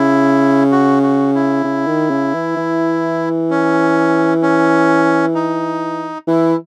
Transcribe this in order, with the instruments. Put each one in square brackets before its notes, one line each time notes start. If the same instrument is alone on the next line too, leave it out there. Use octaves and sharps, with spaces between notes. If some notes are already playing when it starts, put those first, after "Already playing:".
Already playing: [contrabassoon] C#3 [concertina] E4
[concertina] F#4
F#4
E4
[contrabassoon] C#3
D#3
C#3
E3
E3
[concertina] C#4
C#4
D#4
[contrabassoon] E3 [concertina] E4